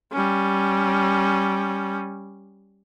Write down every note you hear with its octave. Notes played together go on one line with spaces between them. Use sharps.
G3 C#4